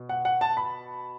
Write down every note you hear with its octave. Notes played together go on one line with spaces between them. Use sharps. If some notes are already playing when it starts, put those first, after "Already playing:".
Already playing: B2
F#5
F#5
A5
B5